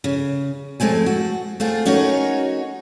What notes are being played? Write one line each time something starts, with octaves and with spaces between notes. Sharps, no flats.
C#3
F2 G#3 A3 C4 G#5
F#4
A3 C4 F4 G#4
C#4 D#4 F#4 G#4 A#4 C#5